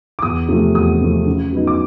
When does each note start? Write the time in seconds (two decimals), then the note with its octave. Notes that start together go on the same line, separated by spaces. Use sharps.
0.19 D6
0.22 E2 D#6
0.48 C3 F3 A3
0.74 E2 D#6
1.00 C3 F3 A3
1.26 C#3
1.53 F#3 B3 D#4
1.67 D6